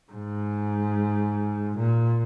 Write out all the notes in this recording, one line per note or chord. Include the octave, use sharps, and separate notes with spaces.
G#2
A#2